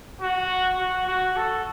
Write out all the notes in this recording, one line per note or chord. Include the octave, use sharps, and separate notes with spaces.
F#4
F#4
F#4
A4